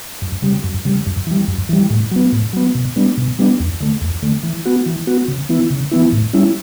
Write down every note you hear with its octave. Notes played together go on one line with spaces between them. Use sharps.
F#2
C#3 G3
F#2
C#3 G3
F#2
E3 G3
F#2
E3 G3
A2
F#3 B3
A2
F#3 B3
B2
G3 B3 D4
B2
G3 B3 D4
E2
D3 A3
E2
D3 A3
E3
B3 F#4
E3
B3 F#4
C#3
E3 B3 E4
C#3
E3 B3 E4
A2
G3 C#4 E4